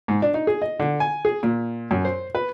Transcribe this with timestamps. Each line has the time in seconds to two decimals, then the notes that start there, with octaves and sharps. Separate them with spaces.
0.08 G#2
0.22 D4
0.34 D#4
0.47 G#4
0.62 D#5
0.80 D3
1.00 G#5
1.25 G#4
1.43 A#2
1.91 F#2
2.05 C5
2.35 B4